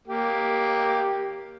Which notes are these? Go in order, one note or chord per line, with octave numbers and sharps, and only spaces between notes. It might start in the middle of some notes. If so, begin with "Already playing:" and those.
A#3 G4